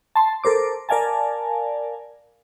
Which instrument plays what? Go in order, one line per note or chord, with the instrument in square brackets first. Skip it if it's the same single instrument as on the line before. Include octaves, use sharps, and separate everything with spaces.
[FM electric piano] A5 C6
A4 A#4 C5 D6
A#4 D5 F5 G#5 A5